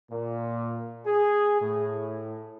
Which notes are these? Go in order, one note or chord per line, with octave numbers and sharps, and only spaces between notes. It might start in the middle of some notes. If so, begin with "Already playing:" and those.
A#2
G#4
A2